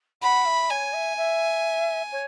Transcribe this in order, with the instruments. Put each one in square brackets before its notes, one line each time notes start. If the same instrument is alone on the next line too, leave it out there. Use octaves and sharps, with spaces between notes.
[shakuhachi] F#5 [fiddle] B5
[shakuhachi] E5
[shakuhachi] C#5 [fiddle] G#5
[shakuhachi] E5
E5
C#5